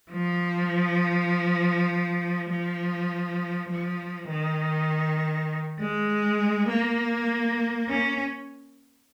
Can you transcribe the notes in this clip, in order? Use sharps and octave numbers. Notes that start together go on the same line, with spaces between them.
F3
F3
F3
D#3
G#3
A#3
C#4